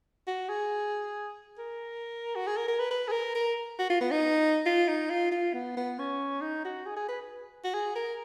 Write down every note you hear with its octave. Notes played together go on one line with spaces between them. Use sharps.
F#4
G#4
A#4
F#4
G#4
A#4
A#4
B4
B4
G#4
A#4
A#4
F#4
F4
B3
D#4
F4
D#4
F4
F4
B3
B3
C#4
D#4
F#4
G#4
G#4
B4
F#4
G#4
A#4